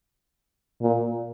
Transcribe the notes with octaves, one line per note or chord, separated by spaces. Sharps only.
A#2